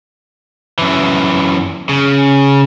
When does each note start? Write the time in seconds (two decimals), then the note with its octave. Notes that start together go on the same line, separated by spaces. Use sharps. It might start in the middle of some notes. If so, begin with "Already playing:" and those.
0.79 F#2 E3
1.89 C#3